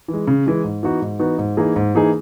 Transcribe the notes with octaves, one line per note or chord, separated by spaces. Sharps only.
E3
G#3
C#3
E3 G#3
G#2
E3 B3 D#4 F#4
G#2
E3 B3 D#4 F#4
G#2
E3 A#3 D#4 G#4
G#2
E3 A#3 D#4 G#4